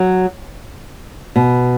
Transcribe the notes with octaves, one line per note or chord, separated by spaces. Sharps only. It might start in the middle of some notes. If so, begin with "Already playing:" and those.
Already playing: F#3
B2